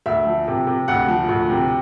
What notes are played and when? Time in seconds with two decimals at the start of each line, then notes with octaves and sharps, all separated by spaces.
0.06 D2 E5
0.26 F3
0.48 C3
0.67 C3
0.88 D2 F#5
1.08 F3
1.29 D2
1.50 C3